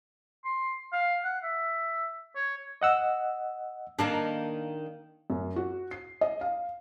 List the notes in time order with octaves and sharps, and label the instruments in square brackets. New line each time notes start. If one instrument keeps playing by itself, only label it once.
[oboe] C6
F5
F#5
E5
C#5
[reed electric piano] D#5 F#5 E6
[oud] D#3 A#3 D4
[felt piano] F#2
F#4
C7
D#5
F5